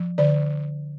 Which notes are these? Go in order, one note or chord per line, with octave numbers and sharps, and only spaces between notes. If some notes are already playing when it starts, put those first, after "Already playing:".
Already playing: F3
D3 D5